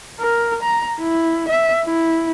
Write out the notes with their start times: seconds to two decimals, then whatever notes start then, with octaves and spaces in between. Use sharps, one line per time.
0.20 A#4
0.63 A#5
1.00 E4
1.49 E5
1.85 E4